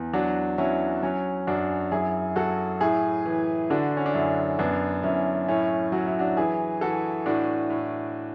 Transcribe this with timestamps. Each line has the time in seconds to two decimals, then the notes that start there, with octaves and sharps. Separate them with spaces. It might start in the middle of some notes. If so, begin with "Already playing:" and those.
Already playing: E2
0.13 F#3 D4 F#4
0.58 F#3 C#4 E4
1.03 F#3 C#4
1.47 F#2 D4 F#4
1.91 F#3 E4 G#4
2.36 F#3 F#4 A4
2.81 A2 E4 G#4
3.26 E3
3.70 D3 D4 F#4
3.97 C#4
4.06 D4
4.14 F#2 C#4 E4
4.59 F#2 B3 D4
5.03 F#2 C#4 E4
5.48 A2 C#4 E4
5.92 F#3 F#4
6.06 E4
6.19 D4 F#4
6.37 E3 E4 G#4
6.81 E3 F#4 A4
7.26 A2 D4 F#4
7.70 A2